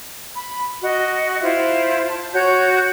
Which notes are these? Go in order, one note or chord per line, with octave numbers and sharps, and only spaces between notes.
B5
F#4 D#5
E4 F4 C5 E5
A5
F#4 C#5 G6